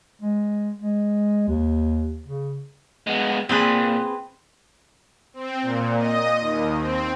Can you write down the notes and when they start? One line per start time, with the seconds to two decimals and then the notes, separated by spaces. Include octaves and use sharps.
0.22 G#3
0.81 G#3
1.48 D#2
2.26 C#3
3.07 G#3 B3
3.49 A#2 C4 G#4 B4
5.34 C4
5.62 A#2
5.97 D#5
6.40 D#2
6.77 C4